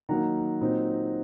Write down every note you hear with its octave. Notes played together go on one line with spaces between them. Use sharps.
D#3 F#3 A#3 D#4 F#5 A#5
A#2 F#3 C4 D#4